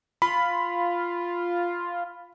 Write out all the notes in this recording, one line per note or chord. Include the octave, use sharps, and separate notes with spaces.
F4 B5